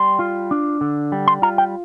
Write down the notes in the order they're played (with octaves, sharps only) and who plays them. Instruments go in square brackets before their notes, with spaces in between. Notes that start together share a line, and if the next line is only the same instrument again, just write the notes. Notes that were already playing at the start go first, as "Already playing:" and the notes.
Already playing: [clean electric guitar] G3 C6
F4
D4
D3
G3
C6
F4 A#5
G5